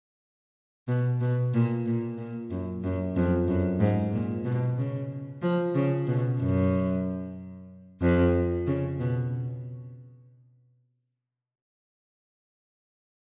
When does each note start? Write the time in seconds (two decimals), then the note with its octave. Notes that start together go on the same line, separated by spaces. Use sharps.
0.88 B2
1.21 B2
1.54 A#2
1.86 A#2
2.18 A#2
2.50 F#2
2.84 F#2
3.16 F2
3.48 F#2
3.80 G#2
4.13 A#2
4.44 B2
4.78 C#3
5.42 F3
5.75 C#3
6.07 B2
6.40 F#2
8.01 F2
8.67 C#3
8.99 B2